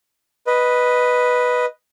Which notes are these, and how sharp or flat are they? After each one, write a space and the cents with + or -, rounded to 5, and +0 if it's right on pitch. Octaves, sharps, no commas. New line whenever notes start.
B4 +0 D#5 +0